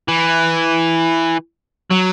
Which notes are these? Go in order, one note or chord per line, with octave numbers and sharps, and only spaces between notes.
E3
F#3